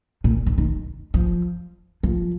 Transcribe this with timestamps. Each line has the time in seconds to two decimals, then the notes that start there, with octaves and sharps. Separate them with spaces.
0.24 A#2
0.46 D3
0.58 D#3
1.14 F3
2.03 F3